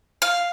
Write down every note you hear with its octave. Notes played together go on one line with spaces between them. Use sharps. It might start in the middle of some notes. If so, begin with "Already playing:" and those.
F5